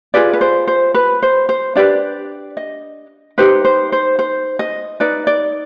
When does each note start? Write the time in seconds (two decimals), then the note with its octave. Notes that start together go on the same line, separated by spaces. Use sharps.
0.14 F4 G#4 B4 D5
0.33 B4
0.41 C5
0.68 C5
0.95 B4
1.22 C5
1.49 C5
1.75 D4 G4 B4 D5
2.57 D#5
3.38 D#4 G4 B4 C5
3.65 C5
3.92 C5
4.19 C5
4.59 D#5
5.00 D#4 B4 D5
5.27 D5